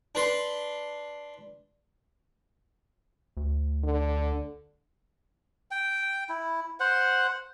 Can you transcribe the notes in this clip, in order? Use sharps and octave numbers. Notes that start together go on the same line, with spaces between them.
D4 B4 C6
D2
D3
G5
E4
C5 F#5